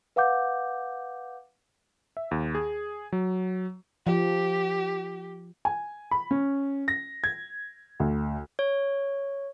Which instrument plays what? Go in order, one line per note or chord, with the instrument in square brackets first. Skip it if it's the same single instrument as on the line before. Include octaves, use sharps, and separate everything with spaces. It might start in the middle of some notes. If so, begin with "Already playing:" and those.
[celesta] B4 F5 F#5 D6 G6
[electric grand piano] E5
D#2
G#4
F#3
[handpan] F3 [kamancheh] G4
[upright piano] G#5
B5
C#4
A#6
G#6
D2
[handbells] C#5